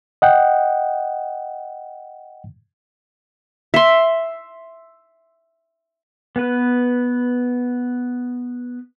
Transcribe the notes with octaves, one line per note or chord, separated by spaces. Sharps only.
D#5 F#5 G5
E5 C6
B3 B4